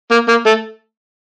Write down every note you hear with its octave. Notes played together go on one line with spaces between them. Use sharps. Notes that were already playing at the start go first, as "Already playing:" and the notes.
A#3
A#3
A3